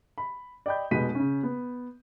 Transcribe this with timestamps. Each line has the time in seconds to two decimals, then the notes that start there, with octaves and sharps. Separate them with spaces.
0.18 B5
0.66 D5 D#5 G5 B5 G6
0.91 F1 B2 G#3 B3 B6 D#7
1.15 C#3 C#4
1.43 B3